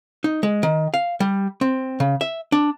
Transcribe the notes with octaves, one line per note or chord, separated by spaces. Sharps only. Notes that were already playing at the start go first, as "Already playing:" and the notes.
D#4
G#3
D#3
F5
G3
C4
C#3
E5
D4